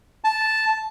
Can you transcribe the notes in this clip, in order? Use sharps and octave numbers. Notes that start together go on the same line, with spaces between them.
A5